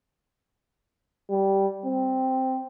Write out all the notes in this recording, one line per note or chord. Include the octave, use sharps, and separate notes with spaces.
G3
C4